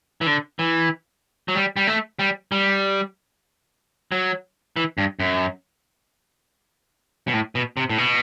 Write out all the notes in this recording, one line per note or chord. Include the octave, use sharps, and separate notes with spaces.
E3
D3
E3
F#3
G3
G3
A3
G3
G3
F#3
E3
G2
F#2
B2
A2
B2
C3
A2
B2